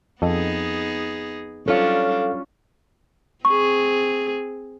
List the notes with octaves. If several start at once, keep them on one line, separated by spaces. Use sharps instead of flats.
F2 B3 D#4 G#4 A4 D#5
F#3 G3 C#4 D4 F4 A4 C#5 F5
C4 G#4 C#6